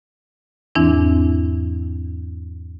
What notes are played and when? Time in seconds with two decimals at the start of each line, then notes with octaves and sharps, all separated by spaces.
0.75 E2 G#2 E3 C4 D4 E4